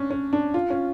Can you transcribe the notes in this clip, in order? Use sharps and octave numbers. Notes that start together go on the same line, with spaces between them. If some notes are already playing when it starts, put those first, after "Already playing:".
Already playing: C#4 D4
C#4
D4
F4
C#4